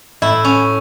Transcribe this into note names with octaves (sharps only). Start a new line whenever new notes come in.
A2 E4
C#4